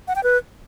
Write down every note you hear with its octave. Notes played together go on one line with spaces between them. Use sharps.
F#5
G5
B4